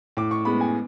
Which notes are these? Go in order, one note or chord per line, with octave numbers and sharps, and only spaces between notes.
A2 D6
C#6
G#3 B3 B5
G#5